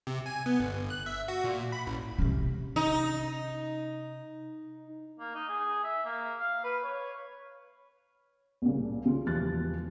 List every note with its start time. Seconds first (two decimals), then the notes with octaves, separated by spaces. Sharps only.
0.07 C3
0.26 G#5
0.46 B3
0.60 G1
0.90 F#6
1.06 E5
1.28 F#4
1.44 A#2
1.72 B5
1.87 A1
2.18 C3 C#4
2.76 D#4
5.19 A#3
5.35 D#4
5.48 G#4
5.84 E5
6.05 A#3
6.39 F5
6.64 B4
6.84 C#5
8.62 C2 A#2 C#3
9.06 C#3 F4
9.26 E1 E3 F3 G3 F#6 A6